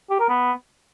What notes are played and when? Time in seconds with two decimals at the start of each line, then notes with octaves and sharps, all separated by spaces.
0.10 G4
0.20 A#4
0.29 B3